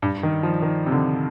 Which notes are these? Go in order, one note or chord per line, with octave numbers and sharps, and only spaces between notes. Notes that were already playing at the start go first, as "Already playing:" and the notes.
G2
D#3
F3
D#3
C3
D3